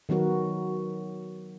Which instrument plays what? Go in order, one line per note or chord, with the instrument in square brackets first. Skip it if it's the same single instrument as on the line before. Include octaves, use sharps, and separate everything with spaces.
[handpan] D#3 F#3 B3 F#4 A#4